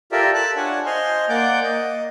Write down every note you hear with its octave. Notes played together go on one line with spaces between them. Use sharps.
F4 G4 A4 A#4 D5 E5
A5 E6 F#6
D4 F4 C#5 F#5 G#5 A5
C5 D#5 G#5 C6 F6
A#3 D5 F#5 D6 G6
D#5